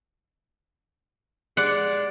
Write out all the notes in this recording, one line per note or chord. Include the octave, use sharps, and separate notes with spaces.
G#3 G4 D5 F#5